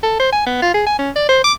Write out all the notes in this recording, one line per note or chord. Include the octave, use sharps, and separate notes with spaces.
A4
C5
G#5
B3
F4
G#4
G#5
C#4
D5
C5
D6